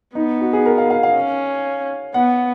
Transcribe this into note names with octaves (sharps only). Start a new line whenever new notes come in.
B3 D#4
F#4
G#4
A#4
F5
F5
F5
C#4
B3 F#5